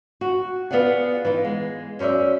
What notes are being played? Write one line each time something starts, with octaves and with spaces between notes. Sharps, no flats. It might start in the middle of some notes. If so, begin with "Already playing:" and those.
F#4
B3 F4 G#4 D5 F#5
E3 D#4 F4
G#3
F#2 C#4 C5 D5 E5